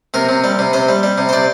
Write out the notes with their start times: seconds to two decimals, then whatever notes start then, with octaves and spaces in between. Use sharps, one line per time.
0.14 C3 A#4
0.29 C3
0.44 G3
0.59 C3
0.73 C3 C5
0.89 G3
1.03 G3
1.18 C3
1.29 C5
1.33 C3 D5